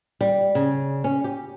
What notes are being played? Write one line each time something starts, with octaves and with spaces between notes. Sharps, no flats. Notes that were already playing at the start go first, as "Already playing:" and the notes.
G3
C#3
C#4
G4